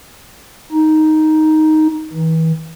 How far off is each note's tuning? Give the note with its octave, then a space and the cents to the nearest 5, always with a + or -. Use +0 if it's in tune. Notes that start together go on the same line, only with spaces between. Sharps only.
D#4 +5
E3 -35